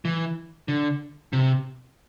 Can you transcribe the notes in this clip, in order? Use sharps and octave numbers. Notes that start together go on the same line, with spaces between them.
E3
D3
C3